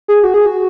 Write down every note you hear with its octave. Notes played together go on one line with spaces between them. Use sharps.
G#4
F#4
G#4
F#4